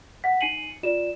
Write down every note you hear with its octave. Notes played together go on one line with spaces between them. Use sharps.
F#5 B6
D#4 G#5 C7 C#7 D#7 F#7
F4 D5 E7